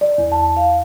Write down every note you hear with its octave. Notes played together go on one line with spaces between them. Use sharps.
D5
E2
A5
F5